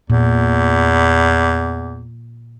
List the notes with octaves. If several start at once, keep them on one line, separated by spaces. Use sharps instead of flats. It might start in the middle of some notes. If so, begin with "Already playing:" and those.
E2 A#2